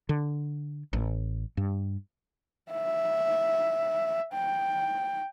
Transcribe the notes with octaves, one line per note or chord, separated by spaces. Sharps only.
D3
A1
G2
E5
G5